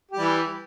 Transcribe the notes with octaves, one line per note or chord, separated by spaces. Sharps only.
E3 G3 G4